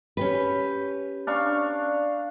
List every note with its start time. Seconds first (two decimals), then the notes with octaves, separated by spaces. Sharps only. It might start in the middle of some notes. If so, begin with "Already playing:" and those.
0.17 C#4 G4 B4
1.27 D4 F5 C#6